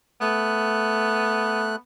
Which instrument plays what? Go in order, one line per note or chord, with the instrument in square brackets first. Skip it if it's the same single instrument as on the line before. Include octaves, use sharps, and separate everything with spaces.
[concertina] A3 F#6 [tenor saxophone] B3